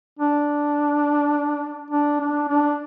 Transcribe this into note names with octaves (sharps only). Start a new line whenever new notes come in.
D4
D4
D4
D4